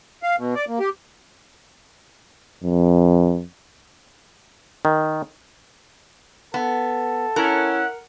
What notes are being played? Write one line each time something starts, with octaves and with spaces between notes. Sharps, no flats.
F5
B2
D5
A#3
G4
F2
D#3
B3 A4
C#4 E4 A#4 F#5